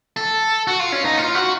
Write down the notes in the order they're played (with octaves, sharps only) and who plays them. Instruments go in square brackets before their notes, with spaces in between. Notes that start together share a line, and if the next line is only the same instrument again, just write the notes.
[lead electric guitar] A4
F#4
F4
C#4
D#4
F4
F#4